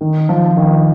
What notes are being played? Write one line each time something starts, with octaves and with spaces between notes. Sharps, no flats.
D#3
F3
D#3